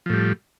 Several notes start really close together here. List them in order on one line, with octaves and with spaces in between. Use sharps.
F3 A2 G3